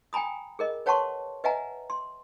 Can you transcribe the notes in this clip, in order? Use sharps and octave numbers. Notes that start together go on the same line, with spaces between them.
G5 G#5 A#5 B5 D#6
G#4 A#4 D#5
B4 C#5 F#5 A5 C6 C#6
B4 D#5 E5 F#5 G#5 A#5
C6